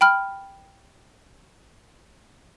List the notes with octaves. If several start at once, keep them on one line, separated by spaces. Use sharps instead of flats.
G5 B5 F6